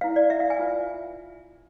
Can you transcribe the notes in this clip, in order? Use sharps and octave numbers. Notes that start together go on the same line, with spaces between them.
E4 B4 F5
D5
E5
F5
G#5
F4 B4